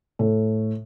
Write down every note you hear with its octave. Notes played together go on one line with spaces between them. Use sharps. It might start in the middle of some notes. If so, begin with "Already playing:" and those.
A2